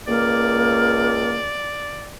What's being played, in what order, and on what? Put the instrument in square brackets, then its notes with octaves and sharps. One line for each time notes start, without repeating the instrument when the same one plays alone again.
[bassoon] C#2 [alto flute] A#3 [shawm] D5